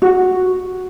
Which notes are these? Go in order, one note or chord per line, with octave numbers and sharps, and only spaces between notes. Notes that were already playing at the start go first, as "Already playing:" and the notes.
F#4